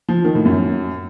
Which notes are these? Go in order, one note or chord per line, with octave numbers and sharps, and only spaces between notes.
F3
D#3
A2
F#2